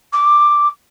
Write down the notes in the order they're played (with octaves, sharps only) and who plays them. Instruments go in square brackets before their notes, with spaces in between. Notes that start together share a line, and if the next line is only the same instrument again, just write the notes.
[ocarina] D6